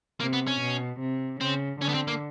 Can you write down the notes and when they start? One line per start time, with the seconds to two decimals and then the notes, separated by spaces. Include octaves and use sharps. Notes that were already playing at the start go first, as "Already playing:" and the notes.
0.20 C3 A#3
0.33 B3
0.47 C#4
0.61 B2
1.01 C3
1.41 C#3 C4
1.82 D3 C#4
1.89 B3
1.94 C4
2.08 A#3